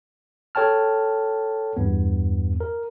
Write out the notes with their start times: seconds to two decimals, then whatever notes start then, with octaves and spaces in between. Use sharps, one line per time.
0.55 A4 C#5 G5 A5 F6
1.77 E2 G2 B3
2.61 A#4